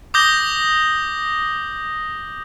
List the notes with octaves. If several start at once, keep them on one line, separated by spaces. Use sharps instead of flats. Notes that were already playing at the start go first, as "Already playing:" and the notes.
D6 D#6 G6 A#6 G7